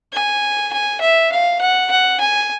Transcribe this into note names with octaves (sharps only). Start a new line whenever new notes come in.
G#5
G#5
E5
F5
F#5
F#5
G#5